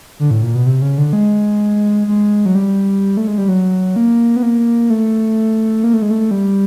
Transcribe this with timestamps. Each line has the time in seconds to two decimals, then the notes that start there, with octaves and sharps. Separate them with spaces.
0.20 D3
0.31 A2
0.42 A#2
0.55 B2
0.66 C3
0.82 C#3
0.98 D3
1.13 G#3
2.07 G#3
2.46 F#3
2.55 G3
3.17 A3
3.27 G#3
3.38 G3
3.48 F#3
3.96 A#3
4.36 B3
4.43 A#3
4.90 A3
5.84 A#3
5.94 A3
6.02 G#3
6.11 A3
6.31 G3